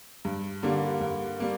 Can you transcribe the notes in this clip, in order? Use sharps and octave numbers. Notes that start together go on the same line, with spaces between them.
G2
D3 G3 A#3
G2
G3 A#3